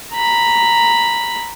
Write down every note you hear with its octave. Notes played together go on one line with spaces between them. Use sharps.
A#5 B5